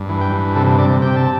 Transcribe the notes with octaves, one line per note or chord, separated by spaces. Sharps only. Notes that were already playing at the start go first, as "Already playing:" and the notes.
Already playing: G2
E3
G5
G2
C3 A4
C3 D5
C3 G5
A5